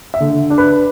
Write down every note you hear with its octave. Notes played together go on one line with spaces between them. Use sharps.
E5
D3
D4
B4